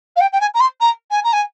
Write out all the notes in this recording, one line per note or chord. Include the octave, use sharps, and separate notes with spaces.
F5
G5
G5
G#5
A#5
C6
A#5
G#5
A#5
G#5